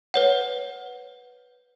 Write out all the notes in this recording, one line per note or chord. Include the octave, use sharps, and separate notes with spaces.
B4 C#5 F#5